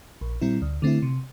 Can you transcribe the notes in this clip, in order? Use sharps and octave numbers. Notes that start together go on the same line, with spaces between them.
A#1
A#2 G3 C4 E4
D2
D3 A3 C4 E4
C3